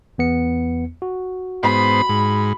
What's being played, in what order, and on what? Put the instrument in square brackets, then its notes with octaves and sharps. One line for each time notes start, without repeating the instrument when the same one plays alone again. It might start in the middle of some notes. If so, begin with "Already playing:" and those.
[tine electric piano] E2 B3 C#7
F#4
[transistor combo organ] G#2 B3 C5 [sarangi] B5
[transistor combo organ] G#2